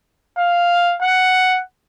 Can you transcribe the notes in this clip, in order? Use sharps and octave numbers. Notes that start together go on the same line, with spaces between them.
F5
F#5